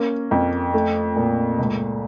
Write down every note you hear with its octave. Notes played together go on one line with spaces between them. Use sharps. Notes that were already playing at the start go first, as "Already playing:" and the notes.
Already playing: A#3 C#4
F2
A3
A#2
C#2